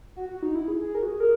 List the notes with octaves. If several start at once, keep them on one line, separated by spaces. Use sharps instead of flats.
F#4
F#4
D#4
E4
G#4
G#4
A#4
F#4
G#4
A#4